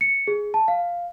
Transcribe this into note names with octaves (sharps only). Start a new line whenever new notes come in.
C#7
G#4
A5
F5